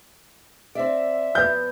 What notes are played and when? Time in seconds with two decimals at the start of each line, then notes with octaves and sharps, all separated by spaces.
0.75 C4 D5 E5
1.35 F3 B3 G6